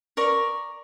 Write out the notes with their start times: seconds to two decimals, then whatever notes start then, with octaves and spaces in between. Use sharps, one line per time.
0.17 A#4 D5 C#6